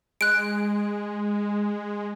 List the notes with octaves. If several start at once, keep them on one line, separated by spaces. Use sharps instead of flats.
G#3 F#6 D7